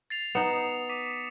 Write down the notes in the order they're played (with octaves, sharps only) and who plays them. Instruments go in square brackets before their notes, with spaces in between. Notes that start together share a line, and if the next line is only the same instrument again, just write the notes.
[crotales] A6 C7 F7
[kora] B3 D#4 [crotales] D#6 C#7 E7
[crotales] D6 B6 D#7